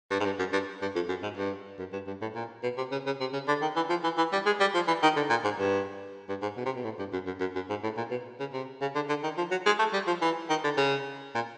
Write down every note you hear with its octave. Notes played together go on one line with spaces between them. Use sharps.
G2
G#2
G2
F#2
G2
G2
F2
F#2
G#2
G2
F#2
G2
G2
A2
A#2
B2
C3
C#3
C#3
C3
C#3
D3
D#3
E3
F3
E3
E3
G3
G#3
G3
F3
E3
D#3
D3
A#2
G#2
G2
G2
G#2
B2
C3
B2
A2
G2
F#2
F#2
F#2
F#2
G#2
A2
A#2
B2
C#3
C3
C#3
D3
D3
D#3
F3
F#3
G#3
A3
G3
F3
E3
D#3
D3
C#3
A#2